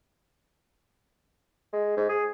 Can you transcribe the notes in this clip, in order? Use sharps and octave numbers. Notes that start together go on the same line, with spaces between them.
G#3
G#2
G#4